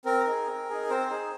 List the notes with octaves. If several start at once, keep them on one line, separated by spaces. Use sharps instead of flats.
C4 A#4
D#4 G#4
C4
D#4 G#4
C4 C5
D#4 G#4